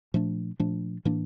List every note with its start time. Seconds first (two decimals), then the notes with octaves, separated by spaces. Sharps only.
0.14 A#2 F3 A3 D4
0.60 A#2 F3 A3 D4
1.05 A2 E3 A#3 D4